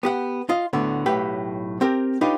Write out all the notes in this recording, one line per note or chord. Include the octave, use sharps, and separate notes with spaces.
B3 G4 F#5
F4 D#5
D2 A2 D3 B3
B1 A2 G4 B4 C#5 G5
C4 G4 A#4
D4 D#4 F4 G4 B4 C#5